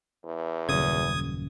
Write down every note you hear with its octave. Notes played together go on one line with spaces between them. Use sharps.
E2
D#1 F#2 C#3 D#6 G#6